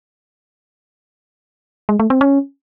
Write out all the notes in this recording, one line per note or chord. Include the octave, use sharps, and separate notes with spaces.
G#3
A3
C4
C#4